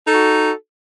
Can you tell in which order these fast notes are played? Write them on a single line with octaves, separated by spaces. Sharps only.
A4 D#4 F#4